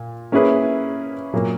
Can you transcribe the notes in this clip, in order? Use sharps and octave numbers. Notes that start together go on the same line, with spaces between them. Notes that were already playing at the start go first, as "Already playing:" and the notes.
Already playing: A#2
A#3 C#4 E4 G#4 B4
A#2 F#3 A#3